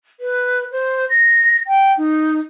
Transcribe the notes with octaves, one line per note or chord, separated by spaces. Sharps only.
B4
C5
A#6
G5
D#4